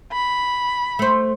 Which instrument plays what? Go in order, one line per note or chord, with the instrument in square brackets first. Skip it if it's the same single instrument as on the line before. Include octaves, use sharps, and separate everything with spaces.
[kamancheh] B5
[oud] A3 C5